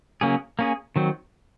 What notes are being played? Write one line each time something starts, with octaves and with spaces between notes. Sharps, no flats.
C#3 F#3 A#3 C#4 G#4
A#3 C#4 G#4
D#3 F#3 C4